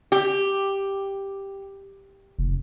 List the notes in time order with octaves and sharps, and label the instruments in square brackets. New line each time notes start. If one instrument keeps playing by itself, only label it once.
[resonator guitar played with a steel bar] G4
[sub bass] F1